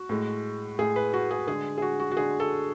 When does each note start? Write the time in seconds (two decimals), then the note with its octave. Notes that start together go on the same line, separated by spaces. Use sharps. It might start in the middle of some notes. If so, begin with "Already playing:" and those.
Already playing: F#4
0.09 A2 G#3
0.79 A2 G#3 G#4
0.96 B4
1.13 F#4
1.31 G#4
1.47 D3 G#3 G#4
1.78 G#4
1.82 F#4
2.00 F#4
2.11 F#4
2.17 D3 G#3 G#4
2.40 A4